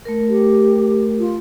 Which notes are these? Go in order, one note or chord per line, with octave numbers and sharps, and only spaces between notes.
A3 A#4
G4
F4